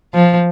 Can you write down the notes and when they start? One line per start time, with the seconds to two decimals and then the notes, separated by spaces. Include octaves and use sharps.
0.14 F3